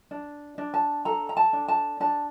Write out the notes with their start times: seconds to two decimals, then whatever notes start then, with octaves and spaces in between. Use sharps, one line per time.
0.11 D4
0.58 D4
0.74 A5
1.05 A4 A#5
1.29 A#5
1.37 A5
1.53 D4
1.68 A5
2.00 D4 A5